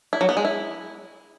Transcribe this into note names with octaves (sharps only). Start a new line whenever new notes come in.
E4
F#3
B3
G#3
E4